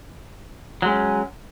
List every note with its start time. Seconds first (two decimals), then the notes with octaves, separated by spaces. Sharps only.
0.82 F#3
0.85 G#3
0.88 C#4